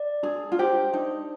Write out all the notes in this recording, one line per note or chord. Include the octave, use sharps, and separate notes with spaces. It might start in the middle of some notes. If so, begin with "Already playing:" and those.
Already playing: D5
D4 G#4
F4
G4 C5
D4 D#4